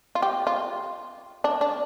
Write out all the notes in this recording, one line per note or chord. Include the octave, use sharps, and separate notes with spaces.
F4
G4
F4
D4
D4